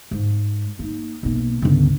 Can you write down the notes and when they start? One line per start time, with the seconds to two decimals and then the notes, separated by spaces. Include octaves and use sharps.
0.11 G#2
0.79 A#3 D#4
1.23 B1 A#3
1.62 G1 C#2